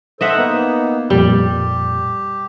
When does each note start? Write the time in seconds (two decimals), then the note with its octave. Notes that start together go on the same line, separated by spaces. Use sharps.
0.21 A4 C5 D#5 E5 F#5
0.36 A#3 B3 D#4
1.10 F2 A#2 G3 G4